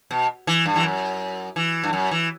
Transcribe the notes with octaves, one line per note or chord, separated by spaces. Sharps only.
B2
E3
G2
E3
F#2
E3
G2
F#2
E3